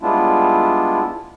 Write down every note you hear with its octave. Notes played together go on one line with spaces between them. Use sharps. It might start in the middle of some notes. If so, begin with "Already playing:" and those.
G3 G#3 B3 D4 E4 F4